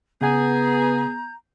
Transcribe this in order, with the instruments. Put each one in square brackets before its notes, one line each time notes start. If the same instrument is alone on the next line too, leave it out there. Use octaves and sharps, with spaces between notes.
[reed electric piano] C#3 F#5 G#5 [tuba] B3 [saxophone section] G#4 [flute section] A#5 G6